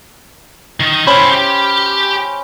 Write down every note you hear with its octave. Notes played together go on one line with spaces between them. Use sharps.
D#3
C#4 E4 C5 G5 B5
G4